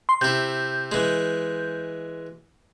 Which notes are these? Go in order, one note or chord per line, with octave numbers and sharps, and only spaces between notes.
C6
C3 E4 G6
E3 G#3